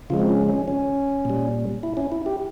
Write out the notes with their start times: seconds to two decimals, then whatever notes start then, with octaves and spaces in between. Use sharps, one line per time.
0.10 C#3 F3 G#3 F4
0.19 C4
0.30 C#4
0.49 C#4
0.68 C#4
1.25 A#2 G3
1.83 E4
1.97 C#4
2.12 E4
2.26 G4